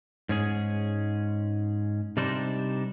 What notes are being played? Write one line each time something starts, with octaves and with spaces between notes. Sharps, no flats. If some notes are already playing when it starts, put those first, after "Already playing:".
G#2 C#4 G#4
C3 G3 D4 D#4 C5